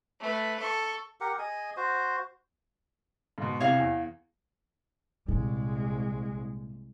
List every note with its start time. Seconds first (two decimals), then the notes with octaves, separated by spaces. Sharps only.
0.21 A3 B4
0.60 A4 C#6
1.20 G4 A#4 F#5
1.39 G#4 D#5 G#5
1.77 F#4 C5
3.38 G#2 B2
3.60 C2 C3 C#5 F5 F#5
3.79 E2
5.28 C2 A#2 G#3